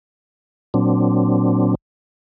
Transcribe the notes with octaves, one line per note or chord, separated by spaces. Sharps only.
A#2 F#3 C4 D4